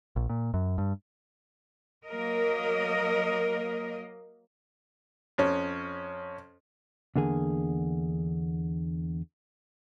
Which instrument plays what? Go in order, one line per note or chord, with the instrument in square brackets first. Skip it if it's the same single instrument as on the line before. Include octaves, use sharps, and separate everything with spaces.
[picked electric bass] A#1
A#2
F#2
G2
[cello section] F#3 A#3 A#4 D#5
[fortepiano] F2 C#4
[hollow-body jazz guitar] E2 D3 A#3 G#4